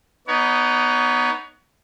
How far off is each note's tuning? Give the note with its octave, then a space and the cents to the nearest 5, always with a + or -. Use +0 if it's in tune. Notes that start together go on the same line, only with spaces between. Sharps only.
B3 +0 D#4 -5 C#5 +30